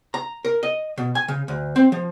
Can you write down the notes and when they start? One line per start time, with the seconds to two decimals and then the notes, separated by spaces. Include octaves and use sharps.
0.14 A#5
0.45 A#4
0.63 D#5
0.98 B2
1.15 G#5
1.28 C#3
1.48 D2
1.76 C4
1.92 F3